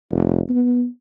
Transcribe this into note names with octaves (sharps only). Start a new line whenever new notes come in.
F1
B3